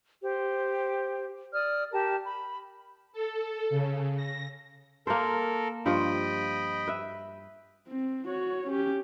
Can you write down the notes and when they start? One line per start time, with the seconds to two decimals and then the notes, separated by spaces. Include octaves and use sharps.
0.22 G4 C5
1.53 D5 D#6 F6
1.92 G4 A#4 G5 A5
2.23 B5
3.13 A4
3.70 C#3
4.16 A#6
5.07 A#3 A4 A#4 C5
5.86 G2 F3 D#5 G5 B5
6.87 B4 E5
7.88 C4
8.27 F#4 C#5
8.67 C#4 G4